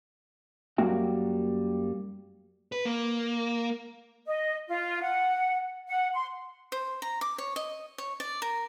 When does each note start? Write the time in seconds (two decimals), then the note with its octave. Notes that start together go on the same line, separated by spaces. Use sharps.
0.78 F#2 G3 A#3 F#4 G5
2.72 B4
2.85 A#3
4.26 D#5
4.68 F4
5.01 F#5
5.89 F#5
6.14 C6
6.72 C5
7.02 A#5
7.21 D6
7.38 C#5
7.56 D#5
7.98 C#5
8.20 D5
8.42 A#4